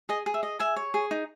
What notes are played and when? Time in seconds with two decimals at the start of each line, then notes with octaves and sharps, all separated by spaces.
0.09 G#4 D#5
0.26 G#4
0.34 E5
0.43 D#5
0.59 G#4 E5 G#5
0.76 C#5
0.94 G#4
1.11 D#4